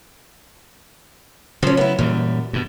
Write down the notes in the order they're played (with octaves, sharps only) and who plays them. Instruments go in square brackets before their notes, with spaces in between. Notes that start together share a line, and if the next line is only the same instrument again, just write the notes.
[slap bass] C#3 F#3 [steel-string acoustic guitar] F3 C#4
[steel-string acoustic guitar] B3 E4
[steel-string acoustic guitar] F#2 [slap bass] A#2 E3 G3
[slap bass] G2 B2